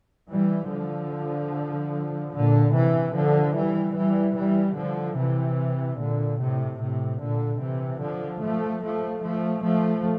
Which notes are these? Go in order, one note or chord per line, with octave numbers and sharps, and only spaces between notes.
E3 G3
D3 F3
A#2 D3
C3 E3
D3 F3
E3 G3
E3 G3
E3 G3
D3 F3
C3 E3
A#2 D3
A2 C3
A2 C3
A#2 D3
C3 E3
D3 F3
F3 A3
F3 A3
F3 A3
F3 A3